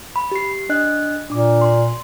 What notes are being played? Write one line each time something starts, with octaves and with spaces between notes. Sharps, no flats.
B5
G4 C7
D4 D#5 F#6
A#2 D4 D6
C6